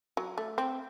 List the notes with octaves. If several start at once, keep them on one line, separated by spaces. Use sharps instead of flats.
F#3
A3
C4